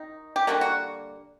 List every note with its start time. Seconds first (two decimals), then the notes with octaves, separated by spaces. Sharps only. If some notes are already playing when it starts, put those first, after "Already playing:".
Already playing: D#3 D#4
0.36 G4
0.47 D3 G3 A#3 F#4
0.61 F#4